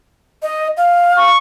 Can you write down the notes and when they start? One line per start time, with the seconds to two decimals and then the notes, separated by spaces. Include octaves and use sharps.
0.42 D#5
0.77 F5
1.17 C#6